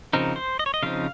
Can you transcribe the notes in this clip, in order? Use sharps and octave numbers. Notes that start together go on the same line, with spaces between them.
C#3 F3 C4 D#4 A#4
C5
D#5
C#5
D#5
C#3 F3 C4 D#4 F5